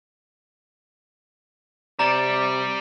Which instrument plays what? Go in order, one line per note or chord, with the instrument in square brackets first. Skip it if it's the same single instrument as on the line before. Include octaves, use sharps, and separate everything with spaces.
[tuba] C3 [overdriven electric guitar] G3 [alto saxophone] D5 [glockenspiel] A#5 A6